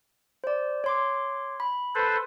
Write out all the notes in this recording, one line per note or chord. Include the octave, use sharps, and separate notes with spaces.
C5 D5
C#5 C6 D6
B5
A4 B4 C5